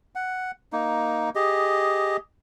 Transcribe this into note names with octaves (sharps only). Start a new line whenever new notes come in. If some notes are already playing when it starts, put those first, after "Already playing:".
F#5
A#3 D#4
G4 G#4 D#5